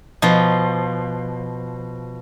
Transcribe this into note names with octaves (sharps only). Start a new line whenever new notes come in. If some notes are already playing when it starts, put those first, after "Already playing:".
B2 F3